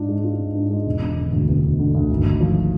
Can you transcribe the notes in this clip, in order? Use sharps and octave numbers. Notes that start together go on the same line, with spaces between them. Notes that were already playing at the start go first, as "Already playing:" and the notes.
Already playing: G#2 D4 F4
G#3
F4
G#2
D4
G#3
E1
E1
D3
D2
E1
E1
D3
D2
G#1
G#1
F3